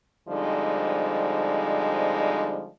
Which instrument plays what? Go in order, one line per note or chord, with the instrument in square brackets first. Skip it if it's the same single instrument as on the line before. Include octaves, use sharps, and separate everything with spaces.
[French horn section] D3 F3 G3 G#3 C4 D#4